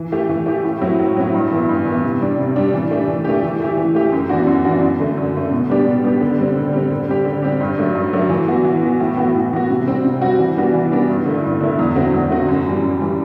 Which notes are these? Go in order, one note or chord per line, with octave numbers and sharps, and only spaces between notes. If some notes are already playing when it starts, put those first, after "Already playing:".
Already playing: E3
A3 E4 G4
E3
A3 E4 G4
A2
F#3 C4 E4
A2
F#3 C4 E4
G2
E3 B3 E4
G2
E3 B3 E4
C3
G3 D4
C3
G3 D4
E3
A3 D4 G4
E3
A3 D4 G4
E3
A3 E4 G4
E3
A3 E4 G4
F#2
E3 B3 D4 F#4
F#2
E3 B3 D4 F#4
F#2
D3 A3
F#2
D3 A3
B2
G3 B3 D4 G4
B2
G3 B3 D4 G4
D3
G3 C4
D3
G3 C4
D3
G3 C4 G4
D3
G3 C4 G4
G2
F#3 A3 D4
G2
F#3 A3 D4
E3
B3 F#4
E3
B3 F#4
A2
E3 B3 F#4
A2
E3 B3 F#4
C3
G3 C4 F#4
C3
G3 C4 F#4
E3
G3 B3 D4 F#4
E3
G3 B3 D4 F#4
G2
D3 A3 E4
G2
D3 A3 E4
E2
D3 A3 C4 F#4
E2
D3 A3 C4 F#4
F#2
E3 G3
F#2
E3 G3